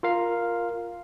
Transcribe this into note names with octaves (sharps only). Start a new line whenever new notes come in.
F4 A#4 F5